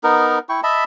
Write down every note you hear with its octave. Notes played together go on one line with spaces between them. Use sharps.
B3 D#4 A#4
E4 G5 C#6
D#5 E5 A5 B5